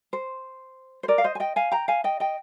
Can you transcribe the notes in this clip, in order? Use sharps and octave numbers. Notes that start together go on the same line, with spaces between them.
C5
C5
A#4 D5
F5
C5 D#5
G#5
D#5 G5
F5 G#5
G5 A#5
F5 G#5
D#5 G5
D#5 G5